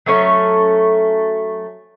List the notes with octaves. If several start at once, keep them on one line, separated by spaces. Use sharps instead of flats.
F#3 A3 C#4 C#5